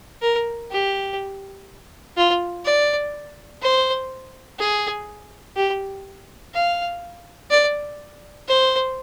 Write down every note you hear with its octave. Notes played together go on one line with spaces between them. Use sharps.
A#4
G4
F4
D5
C5
G#4
G4
F5
D5
C5